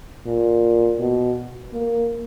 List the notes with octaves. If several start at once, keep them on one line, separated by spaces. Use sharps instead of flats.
A#2
B2
A#3